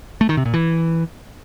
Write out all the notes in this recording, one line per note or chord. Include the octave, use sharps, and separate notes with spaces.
A3
D#3
C3
A#2
E3